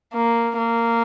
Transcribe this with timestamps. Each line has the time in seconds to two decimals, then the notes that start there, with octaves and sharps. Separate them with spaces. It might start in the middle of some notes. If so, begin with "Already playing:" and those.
0.14 A#3
0.58 A#3